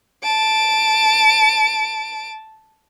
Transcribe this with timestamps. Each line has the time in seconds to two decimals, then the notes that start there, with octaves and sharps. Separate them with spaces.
0.23 A5 D7